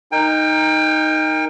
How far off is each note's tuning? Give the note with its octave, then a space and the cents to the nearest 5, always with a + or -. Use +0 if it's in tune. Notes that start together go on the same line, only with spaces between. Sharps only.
D#4 +0 A#4 +0 G5 +30